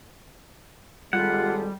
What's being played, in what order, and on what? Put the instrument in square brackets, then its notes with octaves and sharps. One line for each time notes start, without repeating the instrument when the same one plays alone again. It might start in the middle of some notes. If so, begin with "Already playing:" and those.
[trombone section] G#1 G#3 A4 [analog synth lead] G3 [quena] F4 [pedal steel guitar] F#5